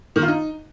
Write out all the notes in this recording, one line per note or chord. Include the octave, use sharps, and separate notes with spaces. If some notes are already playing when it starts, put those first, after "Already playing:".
D#3
F4
D#4